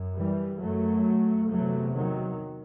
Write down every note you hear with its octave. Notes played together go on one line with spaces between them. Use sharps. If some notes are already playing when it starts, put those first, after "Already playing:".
Already playing: F#2
E3 G3
F#2 F#3 A3
E2 C3 F#3 A3
D#3 F#3